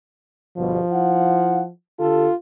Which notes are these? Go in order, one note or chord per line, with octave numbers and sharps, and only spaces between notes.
G1 B2 F3
E4 F5 F#5
D3 F4 G4 A4